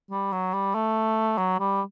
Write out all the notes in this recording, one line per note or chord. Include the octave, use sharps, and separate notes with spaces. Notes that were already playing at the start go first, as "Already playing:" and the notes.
G3
F#3
G3
A3
F#3
G3